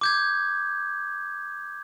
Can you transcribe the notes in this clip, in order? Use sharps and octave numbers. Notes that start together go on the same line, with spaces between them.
D6 G6 G#6